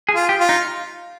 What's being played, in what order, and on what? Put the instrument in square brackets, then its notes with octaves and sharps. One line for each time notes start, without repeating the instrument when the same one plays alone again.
[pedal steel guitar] G#4
[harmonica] F4
[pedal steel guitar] G4
[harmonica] F4
[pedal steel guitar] D#4